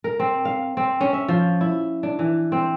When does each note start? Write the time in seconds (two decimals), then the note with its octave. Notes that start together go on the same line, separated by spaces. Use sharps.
0.04 A#4
0.20 C4
0.45 F5
0.77 C4
1.01 C#4
1.13 E5
1.29 F3
1.61 E4
2.03 D4
2.19 E3
2.52 C4